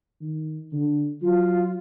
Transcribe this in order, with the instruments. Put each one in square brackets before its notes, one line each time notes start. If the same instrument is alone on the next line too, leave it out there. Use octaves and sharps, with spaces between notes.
[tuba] D#3
D3
[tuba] F#3 [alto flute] F4